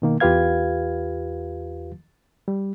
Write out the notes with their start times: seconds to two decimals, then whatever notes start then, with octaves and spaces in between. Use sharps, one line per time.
0.02 B2 D#3 A#3
0.20 E2 F4 G4 B4 F5 G#6
2.48 G3